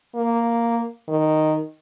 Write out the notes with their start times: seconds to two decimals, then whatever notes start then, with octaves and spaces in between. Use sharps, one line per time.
0.15 A#3
1.08 D#3